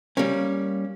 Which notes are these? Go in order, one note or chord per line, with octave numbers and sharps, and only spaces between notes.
G3 A#3 C#4